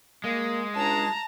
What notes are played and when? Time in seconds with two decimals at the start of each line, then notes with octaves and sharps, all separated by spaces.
0.24 G#3 A#3
0.75 C#2 D4 A5 A#5